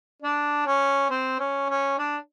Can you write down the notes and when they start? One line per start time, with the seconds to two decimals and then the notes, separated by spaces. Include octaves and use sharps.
0.22 D4
0.66 C#4
1.10 C4
1.39 C#4
1.69 C#4
1.98 D4